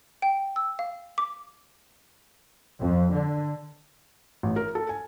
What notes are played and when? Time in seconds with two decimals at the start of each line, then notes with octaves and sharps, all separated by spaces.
0.22 G5
0.56 E6
0.79 F5
1.18 D6
2.80 F2
3.14 D3
4.43 A1
4.56 A#4
4.75 A4
4.89 G#5